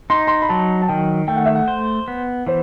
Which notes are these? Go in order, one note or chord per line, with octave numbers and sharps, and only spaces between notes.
D#4 C6
C6
B5
F#3 A5
A5
D#3 G5
A3 G5
F#5
E5
F#5
C5
B3
E3 C5